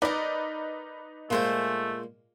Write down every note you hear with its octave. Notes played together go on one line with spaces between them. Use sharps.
D#4 A#4 B4 D5 D#5
A#2 G#3 A3 F4 C5 G#5